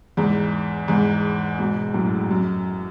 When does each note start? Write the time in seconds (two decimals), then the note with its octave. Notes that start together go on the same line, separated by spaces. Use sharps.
0.17 E2 G#2
0.88 E2 G#2
1.59 G#2 B2
1.94 F#2 A2
2.31 F#2